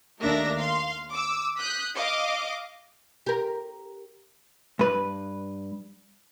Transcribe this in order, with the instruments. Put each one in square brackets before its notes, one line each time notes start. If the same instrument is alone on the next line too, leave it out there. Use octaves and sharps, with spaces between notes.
[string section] D#2 A3 D4 A#4 E5 A#6
F5 C6
D6 E6
D#6 F#6 G6 B6
D#5 F5 D6
[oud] G4 A#4
[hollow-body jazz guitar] G2 B4